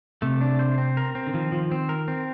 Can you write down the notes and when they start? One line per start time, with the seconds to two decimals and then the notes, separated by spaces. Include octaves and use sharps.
0.22 C3 A3
0.41 D4
0.59 C5
0.78 C4
0.97 A#4
1.15 C4
1.27 D3
1.34 D#3 F3
1.52 F3
1.71 C4
1.89 A#4
2.08 C4